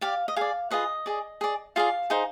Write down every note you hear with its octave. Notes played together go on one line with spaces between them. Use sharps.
G4 D5 F5
D#5
G#4 D5 F5
F4 G#4 B4 D#5
G#4 D5
G#4 D5
F4 G#4 D5 F5
D#4 G#4 C5